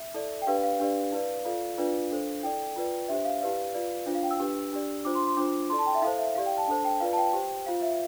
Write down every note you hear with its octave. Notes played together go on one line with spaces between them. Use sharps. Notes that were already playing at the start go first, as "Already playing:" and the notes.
Already playing: E5
E4 A4 D5
G5
D4 G4 B4 D5 F5
F5
D4 G4 B4 D5
E4 B4 D5
F4 A4 D5 F5
D4 F4 B4 D5
D4 A4 C5
E4 A4 D5 G5
F4 B4 D5
D4 G4 C5 E5
F5
E4 G4 B4 D5 F5
F4 B4 D5
D4 F4 C5
F5
G5
E6
D4 G4 B4
D4 G4 D5
D4 F4 C5 D6
C6
C6
D4 F4 C5 D6
E4 A4 D5 C6
A5
G5
E5
E4 A4 C5 F5
E5
E4 G4 D5 F5
G5
A5
D4 A4 C5 A5
G5
F4 B4 D5 F5
A5
G5
G4 C5
F4 C5 F5
E5